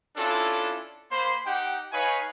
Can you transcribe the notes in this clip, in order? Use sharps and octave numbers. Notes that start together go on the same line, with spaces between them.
C#4 D4 E4 F4 A4
A#3 C5 B5 C6
D#4 G4 F#5 G5
D#4 B4 C#5 F5 G#5 C#6